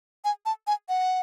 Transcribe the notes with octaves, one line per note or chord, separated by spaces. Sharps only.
G#5
A5
G#5
F#5